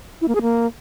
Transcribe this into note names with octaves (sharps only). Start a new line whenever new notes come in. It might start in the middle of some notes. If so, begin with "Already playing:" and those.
E4
A#3
G#4
A#3